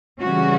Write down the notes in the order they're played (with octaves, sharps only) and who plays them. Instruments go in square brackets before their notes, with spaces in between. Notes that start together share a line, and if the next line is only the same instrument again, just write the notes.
[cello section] C#3 E3 G3 C#4 F#4